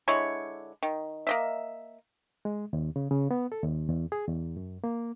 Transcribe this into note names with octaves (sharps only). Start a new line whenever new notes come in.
D3 G#3 E4 C#5
D#3
A#3 D#5 E5
G#3
D#2
C#3
C#3
B3
A4
D#2
E2
G#4
E2
F#2
A#3